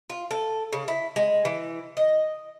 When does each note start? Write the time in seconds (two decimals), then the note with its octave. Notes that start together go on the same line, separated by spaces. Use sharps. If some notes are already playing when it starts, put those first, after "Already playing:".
0.10 F4
0.31 A4
0.73 C#3
0.88 E4
1.16 G#3
1.45 E3
1.97 D#5